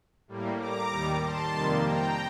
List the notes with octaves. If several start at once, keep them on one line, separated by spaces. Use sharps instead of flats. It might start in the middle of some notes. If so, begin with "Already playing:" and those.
A2 G3 A#3
A#5 D6
D#2 D#3 G3
A5 C6
F2 C3 D#3 G3 A#3
G5 A#5